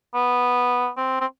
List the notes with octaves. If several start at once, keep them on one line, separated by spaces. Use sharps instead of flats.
B3
C4
C4